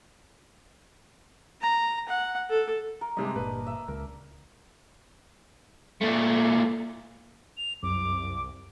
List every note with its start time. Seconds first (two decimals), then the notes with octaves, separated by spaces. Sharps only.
1.61 A#5
2.09 F#5
2.50 A4
3.01 A#4
3.17 G2 C3 G#3 D4 D#5
3.36 G1 A#2 B4
3.66 E5
3.88 C#2 A#4
6.01 A#2 A3
7.57 F7
7.83 C2 F#2 D6